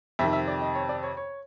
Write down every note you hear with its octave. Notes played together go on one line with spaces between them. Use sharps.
F2 C3 D#3 E5
E5
D5
D#5
C#5
D5
C#5
C#5